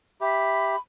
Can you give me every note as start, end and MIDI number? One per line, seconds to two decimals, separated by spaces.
0.21 0.76 67
0.21 0.75 76
0.21 0.79 83